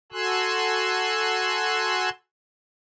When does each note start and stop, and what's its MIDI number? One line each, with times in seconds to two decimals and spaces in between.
0.12 2.09 66
0.12 2.09 69
0.12 2.09 80
0.12 2.09 84
0.12 2.09 88
0.12 2.09 90